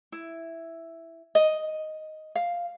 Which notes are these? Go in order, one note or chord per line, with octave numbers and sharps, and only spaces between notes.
E4
D#5
F5